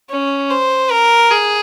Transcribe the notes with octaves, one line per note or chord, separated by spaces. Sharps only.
C#4
C5
A#4
G#4